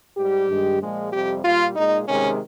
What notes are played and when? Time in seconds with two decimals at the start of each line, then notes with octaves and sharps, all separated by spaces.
0.17 G#2 G3 G4
0.49 G2 D#3 G#3
0.80 A#2 F3 G#3
1.12 F2 C3 G3 G4
1.44 A#2 G3 F4
1.76 A#2 G#3 D#4
2.07 C3 D#3 G#3 C#4